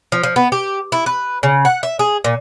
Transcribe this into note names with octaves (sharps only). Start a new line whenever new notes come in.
F3
F3
B3
G4
E4
B4
C#3
F#5
E5
G#4
A#2